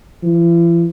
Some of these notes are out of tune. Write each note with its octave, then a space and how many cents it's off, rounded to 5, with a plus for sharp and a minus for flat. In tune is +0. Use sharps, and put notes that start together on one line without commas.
E3 +45